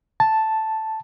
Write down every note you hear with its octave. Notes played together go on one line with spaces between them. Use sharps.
A5